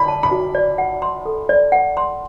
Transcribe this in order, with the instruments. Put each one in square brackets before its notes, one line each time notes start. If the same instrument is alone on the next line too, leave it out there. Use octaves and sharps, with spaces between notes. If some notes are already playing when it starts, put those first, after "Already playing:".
Already playing: [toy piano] D5 [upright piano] B5
[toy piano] A5
[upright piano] B5
[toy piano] F#4
D5
F#5
C6
A4
D5
F#5
C6